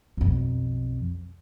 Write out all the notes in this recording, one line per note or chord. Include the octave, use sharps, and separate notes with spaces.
B1 F2